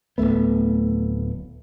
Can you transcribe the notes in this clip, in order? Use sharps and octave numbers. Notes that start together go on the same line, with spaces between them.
D1 G2 A3 B3